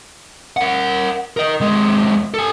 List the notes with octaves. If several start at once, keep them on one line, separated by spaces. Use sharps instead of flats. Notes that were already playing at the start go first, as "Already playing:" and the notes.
A#4 F#5
A#4 D#5
D#2 G#3
A4 G#5